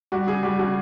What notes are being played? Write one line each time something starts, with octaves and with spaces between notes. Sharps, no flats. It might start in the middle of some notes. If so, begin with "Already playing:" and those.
G3 F#4
C#3 G#4
G3 F#4
C#3 F#4